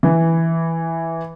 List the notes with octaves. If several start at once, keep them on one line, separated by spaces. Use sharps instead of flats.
E3